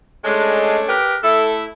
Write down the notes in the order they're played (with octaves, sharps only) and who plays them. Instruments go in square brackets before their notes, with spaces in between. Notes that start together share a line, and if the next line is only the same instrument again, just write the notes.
[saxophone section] G#3 [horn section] A3 C#4 D4
[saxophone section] G4 A#4 B4
[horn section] A3 E4 [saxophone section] A4